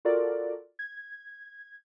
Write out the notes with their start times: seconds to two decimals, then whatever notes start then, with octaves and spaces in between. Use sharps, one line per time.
0.05 F4 F#4 A4 A#4 D5
0.79 G#6